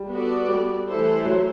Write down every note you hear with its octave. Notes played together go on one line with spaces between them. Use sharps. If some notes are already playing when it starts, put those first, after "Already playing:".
Already playing: G3
B3 F#4 A4 D5
G3
E3 A3 E4 A4 C5
F#3